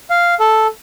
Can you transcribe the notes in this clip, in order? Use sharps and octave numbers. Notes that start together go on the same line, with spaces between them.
F5
A4